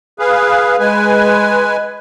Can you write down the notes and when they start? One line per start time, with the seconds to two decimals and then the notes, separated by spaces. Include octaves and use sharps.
0.19 G#4 B4 F5
0.80 G#3 B4 G#5